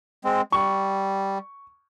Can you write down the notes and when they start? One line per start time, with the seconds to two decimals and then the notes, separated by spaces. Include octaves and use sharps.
0.24 G#3 C4
0.52 G3 C#6